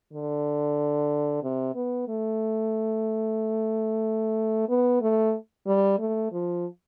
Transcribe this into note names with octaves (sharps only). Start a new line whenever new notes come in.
D3
C3
B3
A3
B3
A3
G3
A3
F3